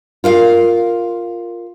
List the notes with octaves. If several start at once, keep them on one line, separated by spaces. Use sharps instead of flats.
F4 A#4 F5